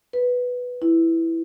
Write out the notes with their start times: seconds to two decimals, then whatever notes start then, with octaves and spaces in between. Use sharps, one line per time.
0.13 B4
0.82 E4